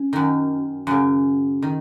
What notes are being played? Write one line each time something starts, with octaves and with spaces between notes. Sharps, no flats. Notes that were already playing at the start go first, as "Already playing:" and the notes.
Already playing: C#4
F#2 D#3
F#2 C#3
D#3